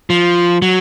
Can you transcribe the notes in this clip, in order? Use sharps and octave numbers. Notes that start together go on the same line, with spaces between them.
F3
F#3